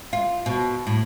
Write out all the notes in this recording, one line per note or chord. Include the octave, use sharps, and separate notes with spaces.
F4
B2
A2